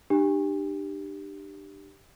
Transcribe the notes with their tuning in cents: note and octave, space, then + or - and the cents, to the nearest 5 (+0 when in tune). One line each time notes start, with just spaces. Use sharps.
D4 +40 G4 +0